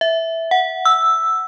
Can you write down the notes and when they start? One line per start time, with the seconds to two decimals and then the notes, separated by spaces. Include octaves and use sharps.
0.01 E5
0.51 F#5
0.85 E6